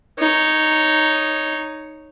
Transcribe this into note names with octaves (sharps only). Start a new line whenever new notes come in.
D#4 C#5